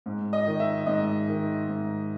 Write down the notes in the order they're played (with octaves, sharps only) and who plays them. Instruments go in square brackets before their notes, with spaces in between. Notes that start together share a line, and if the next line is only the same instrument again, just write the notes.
[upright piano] G#2
D#5
D#3
E5
G#2 D#5
D#3
G#2